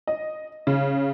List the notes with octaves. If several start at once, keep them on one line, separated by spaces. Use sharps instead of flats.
D#5
C#3